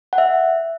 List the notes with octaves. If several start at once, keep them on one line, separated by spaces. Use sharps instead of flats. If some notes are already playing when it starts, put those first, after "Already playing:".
F#5
E5